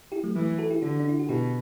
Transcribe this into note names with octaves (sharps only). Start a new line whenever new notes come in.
E4 G4
F#3 A3
E3 F#3 A3
F#4 A4
E4 G4
D3 D4 F#4
D4
E4
F#4
B2 E4 G4